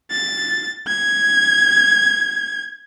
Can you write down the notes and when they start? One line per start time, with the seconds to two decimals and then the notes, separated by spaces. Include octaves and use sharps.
0.11 A6
0.88 G#6